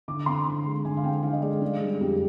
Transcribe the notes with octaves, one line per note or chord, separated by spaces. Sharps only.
D3 D6
C4 C6
D3
G#3
D3 G#5
F5
C4 G5
D3 F5
D#5
G#3 D5
D4 G#4
G3
F2 G4